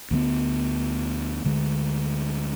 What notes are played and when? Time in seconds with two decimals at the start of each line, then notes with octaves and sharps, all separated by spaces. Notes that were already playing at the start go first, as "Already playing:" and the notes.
0.11 D2 D3 G#3 B3
1.45 D2 D3 G#3